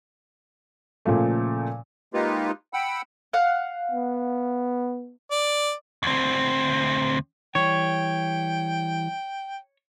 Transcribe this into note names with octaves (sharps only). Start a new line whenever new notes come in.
A#2 C#3 F3 A3
G#3 A#3 D#4 F4 G4 B4
F#5 G5 B5 E6
F5 F#5
B3
D5
D2 C4
E3 G3 C#5 G5